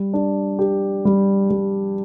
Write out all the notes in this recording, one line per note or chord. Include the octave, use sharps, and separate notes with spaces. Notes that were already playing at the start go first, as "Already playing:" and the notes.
Already playing: G3
D4
G4
G3
G3